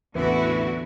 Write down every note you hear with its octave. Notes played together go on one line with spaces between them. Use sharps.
A1 E2 D3 E3 B3 E4 F#4